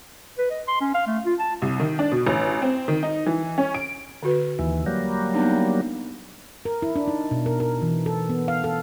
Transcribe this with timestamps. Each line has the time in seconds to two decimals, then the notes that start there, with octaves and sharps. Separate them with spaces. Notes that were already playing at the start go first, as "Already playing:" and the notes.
0.38 B4
0.50 D#5
0.68 C6
0.81 C#4
0.95 F5
1.07 A3
1.25 F4
1.39 A5
1.62 C2
1.79 D#3
1.99 D4
2.12 B2
2.27 A1
2.62 C4
2.88 D#3
3.03 D#4
3.26 E3
3.58 C#4
3.74 D7
4.23 D3 F#4 B4
4.59 D#2 E3
4.86 F#3 G3 A#3
5.34 B3 D4 D#4
6.65 A#4
6.82 E4
6.96 D4
7.08 D#4
7.31 B2
7.46 A#4
7.60 A#4
7.82 E3
8.06 A4
8.29 B3
8.48 F5
8.64 A4